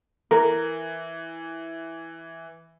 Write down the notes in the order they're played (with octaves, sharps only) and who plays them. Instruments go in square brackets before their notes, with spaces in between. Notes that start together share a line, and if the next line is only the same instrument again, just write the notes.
[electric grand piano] E3 [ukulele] A#4